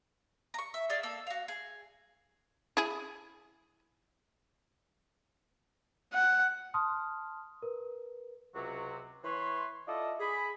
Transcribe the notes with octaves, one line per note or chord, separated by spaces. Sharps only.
A#5 C#6
E5
D#4 G#4 D5 F5
A#3 A4 E6
F#4 F5
G#4
E4 G#4
F#5
A5 C6 D#6 F6
A#4 B4
C#2 C3 F#3 F#4
E3 B4 C#5 C6
E4 F4 A4 D5 D#5
G#4 B5